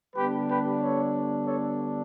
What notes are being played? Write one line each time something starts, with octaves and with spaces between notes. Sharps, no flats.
D3 G3 B3 D4 G4 B4
G4 B4
A4 C#5
A4 C#5